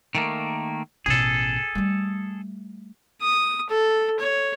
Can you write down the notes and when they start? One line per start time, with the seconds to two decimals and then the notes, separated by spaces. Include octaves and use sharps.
0.15 D#3 A3 A#3
1.06 A1 B2 G#4 A4
1.75 G3 A3
3.21 D#6
3.70 A4
4.19 C#5